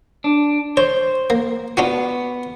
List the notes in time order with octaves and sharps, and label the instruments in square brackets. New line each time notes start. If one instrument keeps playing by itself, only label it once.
[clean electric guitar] D4
[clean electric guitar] C5 [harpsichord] C#5
[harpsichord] A#3
[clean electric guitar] B3 [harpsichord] D4 F4 F#4